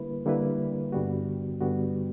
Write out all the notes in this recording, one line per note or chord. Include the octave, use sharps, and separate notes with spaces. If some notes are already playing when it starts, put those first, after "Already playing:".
Already playing: D3 G3 A#3 E4 B4
D3 G3 A#3 E4 B4
G2 D3 G3 B3 F#4
G2 D3 G3 B3 F#4